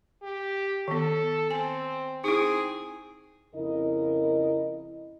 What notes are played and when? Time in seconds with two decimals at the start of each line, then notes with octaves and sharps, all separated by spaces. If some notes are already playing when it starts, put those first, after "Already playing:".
0.23 G4
0.88 D#3 B3 A4
1.51 C4 G#5
2.24 C4 D#4 E4 G#4
3.56 F2 C#3 E4 A#4 D#5